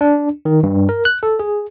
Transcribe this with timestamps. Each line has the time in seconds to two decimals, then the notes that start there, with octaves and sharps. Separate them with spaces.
0.01 D4
0.45 D#3
0.63 G2
0.89 A#4
1.05 F#6
1.23 A4
1.39 G#4